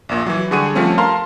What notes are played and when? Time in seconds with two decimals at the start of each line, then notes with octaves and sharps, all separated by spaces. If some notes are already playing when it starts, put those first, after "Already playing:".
0.09 A#1 A#2
0.26 E3 F#3
0.51 D3 G3 G#4 F#5 C#6 D#7
0.75 F3 G3 A3 C4 C#4
0.98 A#4 F5 A5 A#5 C6